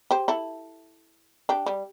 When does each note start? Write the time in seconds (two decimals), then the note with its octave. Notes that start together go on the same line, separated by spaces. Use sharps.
0.11 G4 C5
0.28 E4 A4
1.49 D4 G4
1.66 G3